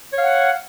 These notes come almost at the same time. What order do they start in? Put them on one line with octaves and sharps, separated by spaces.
C#5 F5 F#5